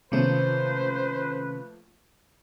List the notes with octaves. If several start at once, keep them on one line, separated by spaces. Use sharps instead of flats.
C3 D#3 F3 A3 A#3 C#4 B4 C5